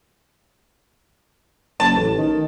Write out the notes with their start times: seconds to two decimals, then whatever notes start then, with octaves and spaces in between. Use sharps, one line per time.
1.80 F#1 A5
1.96 A1
2.18 D#3